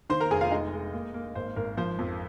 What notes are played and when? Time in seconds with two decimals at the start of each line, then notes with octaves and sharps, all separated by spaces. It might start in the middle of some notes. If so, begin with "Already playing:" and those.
0.10 D#3 C5 C6
0.20 A#4 A#5
0.31 F1 G#4 G#5
0.41 F4 F5
0.51 G#3 D#4 D#5
0.73 G#3
0.93 A#3
1.14 A#3
1.35 G#1 C5
1.56 G#1 A#4
1.77 F3 C5
1.99 F2